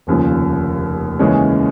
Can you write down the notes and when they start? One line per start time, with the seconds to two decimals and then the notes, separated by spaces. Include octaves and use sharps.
0.07 F1 D#2 C#3 F3
1.19 D#2 C#3 E3 G#3 C#4